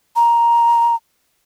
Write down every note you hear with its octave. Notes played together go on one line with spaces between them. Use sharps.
A#5